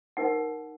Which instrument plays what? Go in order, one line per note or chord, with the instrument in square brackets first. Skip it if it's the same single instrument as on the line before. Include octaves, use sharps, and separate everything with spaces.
[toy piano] D#4 A#4 F#5